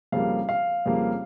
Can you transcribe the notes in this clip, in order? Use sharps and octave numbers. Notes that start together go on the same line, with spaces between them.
F2 C#3 G3 A#3 F5
F5
F2 C#3 G3 A#3